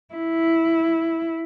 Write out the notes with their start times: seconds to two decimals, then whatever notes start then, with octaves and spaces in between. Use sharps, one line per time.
0.14 E4